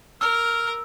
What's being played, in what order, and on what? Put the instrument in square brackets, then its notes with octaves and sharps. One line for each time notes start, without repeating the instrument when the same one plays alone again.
[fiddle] A#4 [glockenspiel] E6 [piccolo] F6